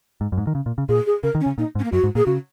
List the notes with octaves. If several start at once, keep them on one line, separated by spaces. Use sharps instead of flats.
G#2
F#2
G#2
D#3
C#3
A#2
C#3
A#2 G#4
G#4
C#3 A#4
D#3
C#4
C#3
A#2 D#4
G#2
C#4
A#3
F#2 F#4
G#2
A#2 G#4
C#3 F#4